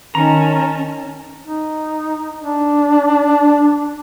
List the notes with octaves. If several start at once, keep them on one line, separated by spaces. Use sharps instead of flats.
D#3 C#4 A5 A#5
D#4
D4